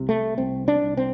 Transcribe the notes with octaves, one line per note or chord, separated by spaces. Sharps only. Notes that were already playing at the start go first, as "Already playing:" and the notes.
Already playing: C2 C3
A3
C2 C4
D4
C2
C4